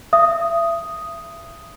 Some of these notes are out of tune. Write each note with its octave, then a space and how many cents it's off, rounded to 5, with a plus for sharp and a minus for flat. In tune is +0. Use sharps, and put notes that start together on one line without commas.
E5 +35 D#6 +0